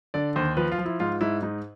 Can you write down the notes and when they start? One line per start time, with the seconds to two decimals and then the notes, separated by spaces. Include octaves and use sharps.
0.14 D3 D5
0.36 D#2 C5
0.57 F3 B4
0.72 F4
0.78 F3
0.85 E4
1.00 G#2 F4
1.21 G#2 E4
1.43 G#2 D#4